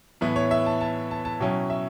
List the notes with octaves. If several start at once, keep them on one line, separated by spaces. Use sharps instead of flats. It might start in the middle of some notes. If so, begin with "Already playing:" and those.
A2 E3 B3 E4
C#5
E5
A5
A5
A5
A5
B2 F#3 C#4 E4 G5
E5